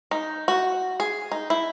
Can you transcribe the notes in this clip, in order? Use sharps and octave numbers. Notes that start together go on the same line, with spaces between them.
D#4
F#4
G#4
D#4
E4